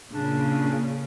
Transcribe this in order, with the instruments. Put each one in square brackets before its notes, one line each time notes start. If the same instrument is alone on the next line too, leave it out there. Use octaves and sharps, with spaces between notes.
[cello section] A#2 C#3 [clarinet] D4